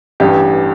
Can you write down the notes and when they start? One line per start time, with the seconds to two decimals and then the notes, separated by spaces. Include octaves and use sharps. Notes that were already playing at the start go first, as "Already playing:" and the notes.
0.20 A1 G2 E3 G4